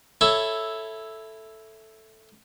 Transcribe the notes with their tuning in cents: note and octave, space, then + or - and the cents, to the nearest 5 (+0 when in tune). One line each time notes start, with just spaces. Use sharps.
E4 +0 A4 +0 C#5 +0